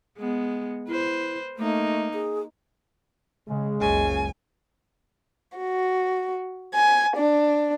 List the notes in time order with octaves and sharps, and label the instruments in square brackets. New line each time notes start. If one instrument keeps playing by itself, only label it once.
[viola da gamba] G#3 B3
[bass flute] E4 [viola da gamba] B4 C5
[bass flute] A3 [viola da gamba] A#3 D#4
[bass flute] G#4
[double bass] C#3 [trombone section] G#3
[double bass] F#1 C#2 [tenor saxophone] C#3 [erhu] G#5
[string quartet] F#4
G#5
D4